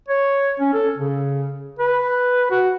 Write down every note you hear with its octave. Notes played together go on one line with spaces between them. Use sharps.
C#5
C#4
A4
C#3
B4
F#4